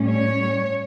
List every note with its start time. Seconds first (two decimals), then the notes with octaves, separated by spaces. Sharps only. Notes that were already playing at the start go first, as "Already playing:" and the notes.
Already playing: A2 G3 C#4
0.09 C#5